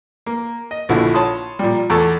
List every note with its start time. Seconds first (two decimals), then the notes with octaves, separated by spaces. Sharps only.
0.26 A#3
0.71 D#5
0.89 A#1 D3 F3 A3 E4 F#4
1.14 C#5 A5 B5 C6 D#6
1.59 A#2 F3 G3
1.90 E2 A3 A4 C#6